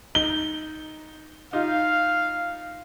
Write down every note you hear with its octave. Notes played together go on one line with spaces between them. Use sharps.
D#4 G7
D#4 F4 F5